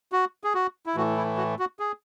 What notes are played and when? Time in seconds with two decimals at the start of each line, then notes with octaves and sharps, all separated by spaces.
0.12 F#4
0.44 G#4
0.54 F#4
0.86 E4
0.95 A2 E3 A3 F#4
1.17 E4
1.37 F#4
1.59 F#4
1.79 G#4